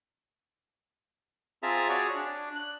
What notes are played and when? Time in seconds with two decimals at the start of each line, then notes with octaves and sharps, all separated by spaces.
1.63 C4 F4 G#4 E5 A5 A#5
1.89 F#4 G#4 C#5 D5
2.15 D4
2.55 F#6